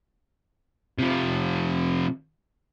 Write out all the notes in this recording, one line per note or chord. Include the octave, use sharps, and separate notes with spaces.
C3 F3